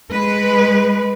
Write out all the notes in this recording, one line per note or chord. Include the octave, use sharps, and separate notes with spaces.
G#3 B4